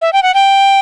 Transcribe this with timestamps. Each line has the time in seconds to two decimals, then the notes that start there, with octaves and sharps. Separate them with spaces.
0.02 E5
0.13 G5
0.23 F#5
0.34 G5